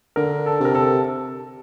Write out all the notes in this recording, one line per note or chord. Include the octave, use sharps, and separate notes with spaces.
D3 A#4
A4
C3 A#4
A4